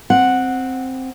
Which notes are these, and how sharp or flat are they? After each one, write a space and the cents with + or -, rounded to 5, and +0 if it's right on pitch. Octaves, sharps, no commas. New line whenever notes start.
C4 +0 F#5 -5